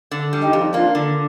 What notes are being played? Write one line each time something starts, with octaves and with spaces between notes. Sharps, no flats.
D3
G3
D#4 G4
F2
A#3 D4 F4
D3